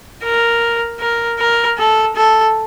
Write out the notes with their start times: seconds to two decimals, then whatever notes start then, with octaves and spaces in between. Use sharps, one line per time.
0.24 A#4
1.00 A#4
1.39 A#4
1.78 A4
2.16 A4